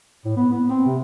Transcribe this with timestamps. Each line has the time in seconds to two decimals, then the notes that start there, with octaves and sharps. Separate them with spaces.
0.25 A2
0.37 B3
0.53 B3
0.70 C4
0.86 C3